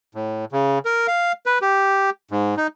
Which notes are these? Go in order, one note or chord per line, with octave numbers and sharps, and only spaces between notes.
A2
C#3
A#4
F5
B4
G4
G#2
D#4